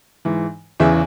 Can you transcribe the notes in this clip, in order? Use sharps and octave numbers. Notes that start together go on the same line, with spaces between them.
G#2 E3
E2 C#3 E3 E5